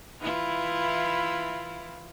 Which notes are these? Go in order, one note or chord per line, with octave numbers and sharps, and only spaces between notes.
E3 E4 F4